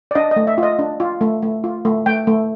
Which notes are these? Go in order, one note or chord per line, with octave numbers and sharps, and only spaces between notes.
D5
D4 D#5
D#5
A3
E5
F4
D#5
D4
F4
A3
A3
F4
A3
A3 G5
A3